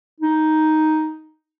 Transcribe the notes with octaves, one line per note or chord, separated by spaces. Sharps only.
D#4